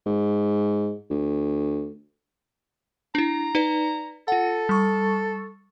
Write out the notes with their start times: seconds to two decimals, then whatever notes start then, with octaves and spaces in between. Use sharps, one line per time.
0.06 G#2
1.10 D2
3.15 D4 E4 A#5
3.55 D#4 B4 D5
4.28 F4 A4 F#5
4.69 G3 C#6